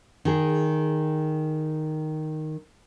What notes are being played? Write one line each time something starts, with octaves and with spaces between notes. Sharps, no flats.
D#3 G#4